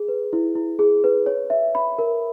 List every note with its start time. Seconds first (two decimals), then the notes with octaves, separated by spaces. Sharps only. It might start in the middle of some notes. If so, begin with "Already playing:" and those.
Already playing: G#4
0.08 B4
0.33 E4
0.55 E4
0.79 G#4
1.04 B4
1.26 C#5
1.50 E5
1.75 B5
1.98 A#4